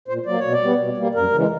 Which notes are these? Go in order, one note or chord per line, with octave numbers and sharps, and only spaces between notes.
A#2 C5
F#3 A#3 D5
B2 C#5
D5
G3 B3
B2
G3 A#3
F#2 A#4
C#3 E3 G#3